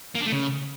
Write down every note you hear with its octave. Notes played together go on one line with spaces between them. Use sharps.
A#3
D4
A3
C#3